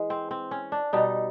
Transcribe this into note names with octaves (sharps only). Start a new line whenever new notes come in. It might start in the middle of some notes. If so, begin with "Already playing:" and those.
Already playing: E3 G#3
C4
C4
C#4
D4
B2 G3 D#4